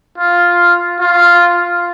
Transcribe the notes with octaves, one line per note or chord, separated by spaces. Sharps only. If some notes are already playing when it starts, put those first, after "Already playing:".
F4
F4